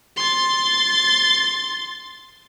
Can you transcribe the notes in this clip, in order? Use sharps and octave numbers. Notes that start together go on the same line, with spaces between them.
C6 A6